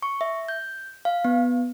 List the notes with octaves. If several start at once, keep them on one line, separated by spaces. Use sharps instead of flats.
C#6
E5
G6
F5
B3